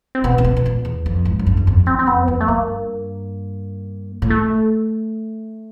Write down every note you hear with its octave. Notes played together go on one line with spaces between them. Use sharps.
C4
B2 B3
C3
B2
B2
A#2
E2
F2
G#2
F#2
G2
E2
F2
E2 C4
C4
F2 B3
C4
F2 B3
A3
G2 A#3
A2
A3